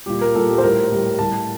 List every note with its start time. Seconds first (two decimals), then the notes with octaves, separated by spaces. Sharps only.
0.06 A#2 G3 G4
0.21 A#4
0.35 A#2 G3 A4
0.48 G4
0.58 C5
0.63 A2 G3 A#4
0.91 A2 G3
1.19 A2 G3 A5